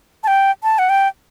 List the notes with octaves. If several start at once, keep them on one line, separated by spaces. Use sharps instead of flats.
A5
G5
A5
F#5
G5